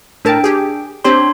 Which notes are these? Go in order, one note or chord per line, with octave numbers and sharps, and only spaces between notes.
A2 D4 A#4 G5 A5
G4 G#4
C4 D4 G4 C5 C#5 C6